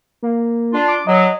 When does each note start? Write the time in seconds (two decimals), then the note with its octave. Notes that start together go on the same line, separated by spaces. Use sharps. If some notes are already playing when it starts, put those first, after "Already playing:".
0.23 A#3
0.73 D4 F4
0.88 D6
1.07 F#3 D#5